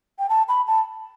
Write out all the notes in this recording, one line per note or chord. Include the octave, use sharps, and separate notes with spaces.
G5
A5
B5
A5